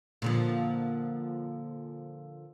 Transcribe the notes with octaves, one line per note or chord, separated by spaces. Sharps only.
A#2 D3 F3